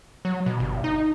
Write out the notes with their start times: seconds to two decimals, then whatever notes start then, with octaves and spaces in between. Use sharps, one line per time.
0.25 F#3
0.46 B2
0.60 G1
0.84 D#4